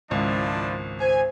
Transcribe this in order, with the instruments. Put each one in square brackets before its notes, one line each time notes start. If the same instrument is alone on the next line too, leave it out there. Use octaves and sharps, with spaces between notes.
[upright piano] G#1 C#2 [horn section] F3 D4 E4
[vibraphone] C5 [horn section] G#5